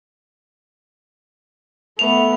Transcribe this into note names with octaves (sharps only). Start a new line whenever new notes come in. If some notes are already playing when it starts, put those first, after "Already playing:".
A3 B3 F7